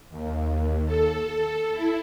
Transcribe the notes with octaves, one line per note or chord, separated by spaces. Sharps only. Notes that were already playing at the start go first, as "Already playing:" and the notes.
D#2
A4
E4